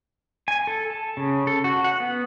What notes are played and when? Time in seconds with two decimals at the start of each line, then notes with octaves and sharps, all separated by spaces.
0.48 G#5
0.67 A4
0.90 A5
1.17 C#3
1.47 A4
1.64 F#4
1.84 F#5
2.00 B3